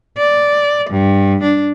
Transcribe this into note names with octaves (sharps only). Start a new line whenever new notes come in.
D5
G2
D4